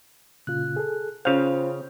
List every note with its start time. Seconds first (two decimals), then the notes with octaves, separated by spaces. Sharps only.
0.47 A#2 C#3 F4 F#6
0.76 G#4 A4
1.25 C#3 C#4 F4 C5 F5 G6